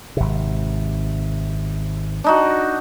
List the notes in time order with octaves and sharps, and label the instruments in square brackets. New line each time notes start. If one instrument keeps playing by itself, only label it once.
[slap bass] G#1 C3
[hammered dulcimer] D4 D#4 F#4